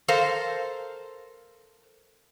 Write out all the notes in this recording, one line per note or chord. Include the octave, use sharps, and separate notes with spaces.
A4 A#4 C5 F5